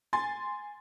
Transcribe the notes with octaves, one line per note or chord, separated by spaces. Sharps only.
G#5 C6 A6